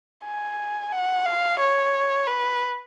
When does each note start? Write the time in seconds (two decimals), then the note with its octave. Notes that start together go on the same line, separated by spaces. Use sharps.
0.25 G#5
0.92 F#5
1.26 F5
1.60 C#5
2.27 B4